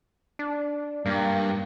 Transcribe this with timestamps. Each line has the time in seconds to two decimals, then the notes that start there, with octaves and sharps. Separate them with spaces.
0.39 D4
1.06 G2 A#3